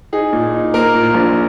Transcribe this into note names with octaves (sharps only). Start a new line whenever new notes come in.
D#4 G#4
A#2
D#4
A#3 A#4
A#2
A#1